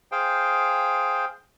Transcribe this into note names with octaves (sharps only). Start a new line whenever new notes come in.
G#4 C5 F5 G5